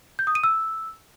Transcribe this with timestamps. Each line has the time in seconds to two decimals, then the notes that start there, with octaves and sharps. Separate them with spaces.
0.19 G6
0.27 D#6
0.35 D#7
0.44 E6